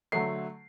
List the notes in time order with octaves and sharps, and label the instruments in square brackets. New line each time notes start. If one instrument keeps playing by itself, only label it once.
[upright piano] D3 F#3 A3 C7